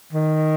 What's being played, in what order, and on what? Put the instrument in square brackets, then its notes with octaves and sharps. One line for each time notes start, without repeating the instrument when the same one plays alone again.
[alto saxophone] D#3